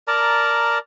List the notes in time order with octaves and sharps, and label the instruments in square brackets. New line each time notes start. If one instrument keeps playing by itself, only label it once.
[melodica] A#4 D5 A5 A#5